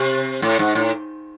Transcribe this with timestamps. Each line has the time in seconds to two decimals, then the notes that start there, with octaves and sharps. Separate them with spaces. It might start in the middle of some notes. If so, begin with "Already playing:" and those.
Already playing: C3
0.42 A2
0.59 G#2
0.75 A2